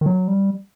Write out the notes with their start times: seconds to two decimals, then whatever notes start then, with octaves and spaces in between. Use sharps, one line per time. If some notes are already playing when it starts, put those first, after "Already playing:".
0.01 D#3
0.06 F#3
0.28 G3